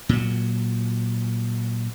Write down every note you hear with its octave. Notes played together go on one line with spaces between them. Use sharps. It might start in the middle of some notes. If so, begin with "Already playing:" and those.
A#2 F#3